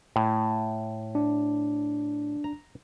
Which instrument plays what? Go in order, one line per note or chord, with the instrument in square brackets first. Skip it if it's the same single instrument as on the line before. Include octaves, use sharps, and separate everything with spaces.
[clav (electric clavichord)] A2
[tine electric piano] D4
[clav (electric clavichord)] A#5